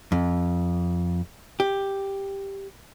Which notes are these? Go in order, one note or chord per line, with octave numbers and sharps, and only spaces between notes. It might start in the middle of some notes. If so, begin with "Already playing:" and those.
F2
G4